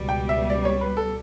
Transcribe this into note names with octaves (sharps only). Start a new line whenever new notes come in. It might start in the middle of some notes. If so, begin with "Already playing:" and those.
Already playing: C#2 B2 G3
G5
E5
D5
C#5
B4
A4